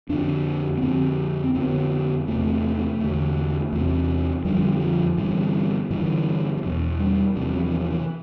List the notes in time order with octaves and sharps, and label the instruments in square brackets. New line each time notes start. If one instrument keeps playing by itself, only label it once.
[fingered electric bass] F2 D3 D4
B3
F2 D3 C4
C4
F2 D3 B3
E2 C3 A3
E2 D3
E2 C3
F2 D3 G3
F3
G2 D3 E3
G2 D3 E3
F3
E2 B2 E3
G3
E2 C3 G3
E3
F3
E3
F3
E3